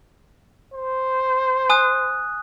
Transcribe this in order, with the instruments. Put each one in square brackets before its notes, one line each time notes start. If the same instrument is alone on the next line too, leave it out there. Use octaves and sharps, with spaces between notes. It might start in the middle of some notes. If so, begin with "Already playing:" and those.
[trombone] C5
[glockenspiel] G#5 D#6 F#6